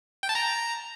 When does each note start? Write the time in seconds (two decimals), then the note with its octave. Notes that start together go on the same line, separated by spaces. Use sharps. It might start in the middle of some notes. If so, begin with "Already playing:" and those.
0.23 G5
0.29 A5
0.35 A#5